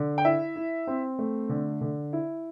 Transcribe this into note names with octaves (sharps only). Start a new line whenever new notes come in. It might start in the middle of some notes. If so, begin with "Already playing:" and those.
Already playing: D3
G5
E4 E5
E4
C4
A3
D3
D3
E4